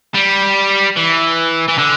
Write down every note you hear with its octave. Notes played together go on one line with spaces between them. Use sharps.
G3
E3
E3
D3